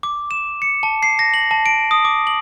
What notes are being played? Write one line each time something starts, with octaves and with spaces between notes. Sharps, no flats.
D6
E7
C#7
A5
C7
A#6
F#7
A5
D7
D#6
D6
F#7